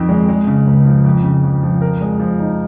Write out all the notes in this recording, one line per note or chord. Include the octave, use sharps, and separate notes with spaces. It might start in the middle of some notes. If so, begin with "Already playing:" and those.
Already playing: F2 D#3 C4
G#3
G#3
C#3
C#2
F3
F2
C#3
F2
F3
A#4
G#3
F3
D#4